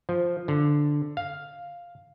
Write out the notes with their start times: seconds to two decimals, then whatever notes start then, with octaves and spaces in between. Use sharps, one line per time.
0.09 F3
0.48 D3
1.17 F5